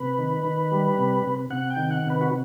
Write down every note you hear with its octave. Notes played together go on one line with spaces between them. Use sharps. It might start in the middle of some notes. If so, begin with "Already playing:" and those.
Already playing: C3 B4
D#3
D#3
G3
C3
C3
C3 F#5
G5
D#3
F#5
C3
B4
F#4